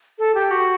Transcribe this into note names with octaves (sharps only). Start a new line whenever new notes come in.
A4
G4
F#4